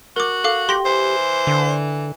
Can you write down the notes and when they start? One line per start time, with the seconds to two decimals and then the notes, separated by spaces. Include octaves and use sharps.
0.16 F#4 A#4 D6
0.44 A4 F5 D6
0.69 G4 C6 A#6
0.85 E3 C5
1.47 D3